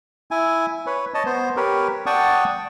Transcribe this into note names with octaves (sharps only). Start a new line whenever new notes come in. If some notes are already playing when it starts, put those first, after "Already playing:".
E4 G#5
B4 C#5
C#5 D#5 A5
B3 C5
G4 A#4 B4 C#5
D5 F#5 G5 A5 C#6 D#6